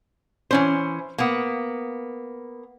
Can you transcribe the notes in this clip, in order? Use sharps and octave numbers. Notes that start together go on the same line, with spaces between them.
E3 C#4 C5
A#3 B3